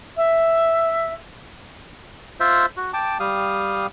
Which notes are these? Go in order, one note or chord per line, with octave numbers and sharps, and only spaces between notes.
E5
F4 C5 E5
F#4
G5 A5 D6
G3 G4 F5 D#6